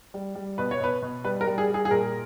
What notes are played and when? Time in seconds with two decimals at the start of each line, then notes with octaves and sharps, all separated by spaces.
0.14 G3
0.35 G3
0.58 B2 B4
0.71 C#5
0.80 B2 B4
1.02 B2
1.24 G3 B4
1.41 A#4
1.47 G3
1.58 G#4
1.70 G3 G#4
1.85 G#4
1.91 A#2 A#4